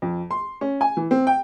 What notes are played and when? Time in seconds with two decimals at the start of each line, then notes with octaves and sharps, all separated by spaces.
0.02 F2
0.31 C6
0.61 C#4
0.81 G#5
0.97 E3
1.11 C4
1.27 G5